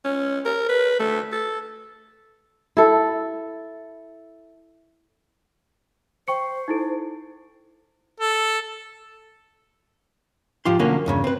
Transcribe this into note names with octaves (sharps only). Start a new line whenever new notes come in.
C#4
A#4
B4
A3
A4
E4 A4
C5 G5 C#6 C#7
D#4 E4 A4
A4
G#2 F3 F4 G4 C6
B1 D3 F#3 A#3 C#4
E2 G2 C#3
C4 B4